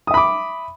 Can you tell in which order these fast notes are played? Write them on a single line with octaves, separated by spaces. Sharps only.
D#6 E5 B5 D6